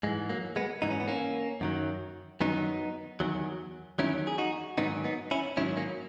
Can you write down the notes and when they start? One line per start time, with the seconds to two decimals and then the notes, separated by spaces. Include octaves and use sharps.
0.03 G#2 G#3
0.06 E3
0.29 F#3 A#3
0.56 G#3 B3
0.82 G#2 E3 D#4
0.90 C#4
1.00 B3
1.08 A#3 C#4
1.61 F#2 D#3 F#3
2.40 F#2 D#3 F#3 B3 D#4
3.20 E2 D#3 F#3
3.99 E2 D#3 F#3 C#4 E4
4.27 G#4
4.38 D#4 F#4
4.78 G#2 D#3 F#3 B3 D#4
5.04 B3 D#4
5.31 C#4 E4
5.57 G#2 D#3 F#3 C#4 E4
5.77 A#3 C#4